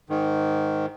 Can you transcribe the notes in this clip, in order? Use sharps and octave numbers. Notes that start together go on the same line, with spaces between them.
G#2 D#3